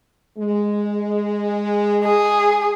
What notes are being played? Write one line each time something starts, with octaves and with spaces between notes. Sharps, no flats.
G#3
G#4